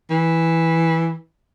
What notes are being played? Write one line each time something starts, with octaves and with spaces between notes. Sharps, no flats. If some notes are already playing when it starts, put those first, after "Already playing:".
E3